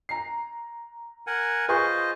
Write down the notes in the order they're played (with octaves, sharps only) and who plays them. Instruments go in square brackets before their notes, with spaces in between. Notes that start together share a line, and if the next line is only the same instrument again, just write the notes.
[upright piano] A#5 C7
[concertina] A#4 F#5 G#5
[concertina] F4 C5 D#5 [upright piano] G#4 B4 C#6